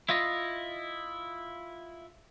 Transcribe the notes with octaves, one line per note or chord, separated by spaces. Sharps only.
E4 F4 D#5